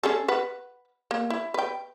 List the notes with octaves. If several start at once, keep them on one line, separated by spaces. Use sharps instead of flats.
C#4 G#4 A4
B4 F#5
A#3
E4
B4 G5